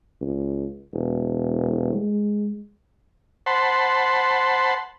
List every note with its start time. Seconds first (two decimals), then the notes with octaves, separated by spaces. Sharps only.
0.21 C#2
0.94 E1
1.94 G#3
3.46 C5 F#5 A5 B5 C6